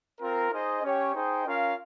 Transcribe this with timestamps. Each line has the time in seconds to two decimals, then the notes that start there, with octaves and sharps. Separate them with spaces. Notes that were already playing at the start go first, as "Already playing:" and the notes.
0.21 C4 F4 A#4
0.51 D#4 G#4 C5 D#5
0.82 C#4 G4 C#5 G5
1.14 D#4 G#4 C5 D#5 G5
1.45 C#4 F4 A#4 F5